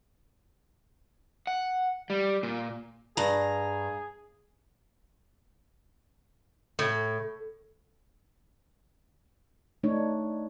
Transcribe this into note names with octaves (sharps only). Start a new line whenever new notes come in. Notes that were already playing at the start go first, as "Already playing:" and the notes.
F#5
G3
A#2
G2 G#4 A#5
A2
A3 D4 D#4 C#5